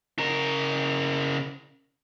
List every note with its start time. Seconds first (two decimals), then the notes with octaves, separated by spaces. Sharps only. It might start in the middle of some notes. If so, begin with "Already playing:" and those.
0.19 C#3 A#4